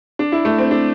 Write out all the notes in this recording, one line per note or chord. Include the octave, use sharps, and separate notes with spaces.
D4
E4
A3
C4
D4